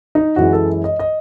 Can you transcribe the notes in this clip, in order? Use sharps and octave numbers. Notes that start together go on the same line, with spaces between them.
D#4
F#2 E3 G#3 F#4
A4
D#5
D#5